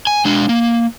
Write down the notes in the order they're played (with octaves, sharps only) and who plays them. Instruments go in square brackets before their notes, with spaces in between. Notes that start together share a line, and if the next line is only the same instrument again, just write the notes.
[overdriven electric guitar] G#5
G#3 D4
A#3